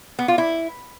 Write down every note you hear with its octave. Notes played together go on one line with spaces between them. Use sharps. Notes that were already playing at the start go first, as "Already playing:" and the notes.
B3
F4
E4